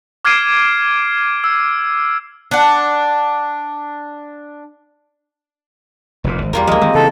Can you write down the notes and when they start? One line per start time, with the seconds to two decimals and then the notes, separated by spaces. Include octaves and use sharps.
0.25 D6 F6 G#6 C7 D7 D#7
1.44 E6
2.51 D4 F#5
6.24 F1 F2 A#2
6.42 G#1
6.53 E2 G3 F4 A#4
6.67 D2 F3 G#3 A#3 D#5
6.82 D#3 G#3 C4
6.95 C#3 E3 A4